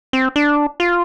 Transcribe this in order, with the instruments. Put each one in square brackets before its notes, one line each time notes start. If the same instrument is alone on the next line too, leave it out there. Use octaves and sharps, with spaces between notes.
[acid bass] C4
D4
F4